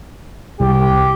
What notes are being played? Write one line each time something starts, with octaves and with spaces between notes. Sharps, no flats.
C2 G4